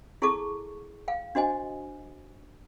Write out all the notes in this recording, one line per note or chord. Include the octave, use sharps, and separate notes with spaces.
E4 G#4 A4 A5 C#6 D6
F5 G5
D4 F#4 C5 D#5 G#5